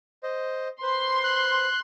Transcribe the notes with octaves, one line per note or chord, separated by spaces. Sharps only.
C5 D#5
B4 C5 C6
F#6